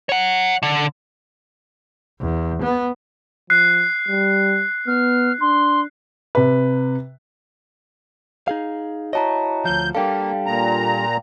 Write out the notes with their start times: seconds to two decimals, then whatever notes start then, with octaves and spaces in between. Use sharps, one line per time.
0.09 C#5 F#5
0.63 D3
2.21 E2
2.63 B3
3.50 F3 F#6 C7
4.08 G3
4.87 B3 F6
5.41 D4 C6
6.35 C3 B4
8.48 D#4 G#4 F5
9.13 E4 F#4 C#5 D#5 A5 A#5
9.65 D2 F3 G6
9.95 G3 A#3 D4 A4 F5 G5
10.46 A#2 A#5